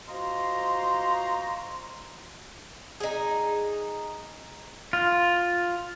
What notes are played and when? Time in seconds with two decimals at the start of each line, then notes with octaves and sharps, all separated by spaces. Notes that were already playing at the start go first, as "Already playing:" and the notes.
0.09 F4 F#4 C5 D#5 A#5 C6
3.00 D#4 G#4
4.93 F4